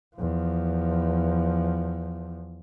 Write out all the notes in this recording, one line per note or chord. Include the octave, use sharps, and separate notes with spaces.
E2 F3